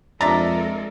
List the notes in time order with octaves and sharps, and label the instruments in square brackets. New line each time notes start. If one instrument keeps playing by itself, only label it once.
[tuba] F2 [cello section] G#3 A4 A#4 [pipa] D4 D5 E5 [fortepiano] A#5